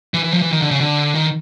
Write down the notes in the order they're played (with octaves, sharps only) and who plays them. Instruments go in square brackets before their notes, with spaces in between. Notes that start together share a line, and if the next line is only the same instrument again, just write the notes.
[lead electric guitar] E3
E3
F3
E3
D#3
D3
C#3
D3
D#3